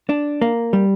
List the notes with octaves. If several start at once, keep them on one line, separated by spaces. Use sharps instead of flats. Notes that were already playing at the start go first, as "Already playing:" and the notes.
D4
A#3
G3